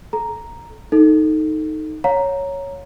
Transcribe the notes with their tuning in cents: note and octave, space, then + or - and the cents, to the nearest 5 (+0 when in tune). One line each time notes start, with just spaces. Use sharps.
A4 -30 A#5 +0
D#4 +0 A4 +0
C#5 +0 F5 +40 A#5 +0